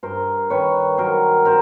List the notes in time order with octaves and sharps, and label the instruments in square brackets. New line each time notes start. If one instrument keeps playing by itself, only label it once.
[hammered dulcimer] G2 A#4 C5
D#3 B4 C#5
F#3 A#4 C5
A#4 C5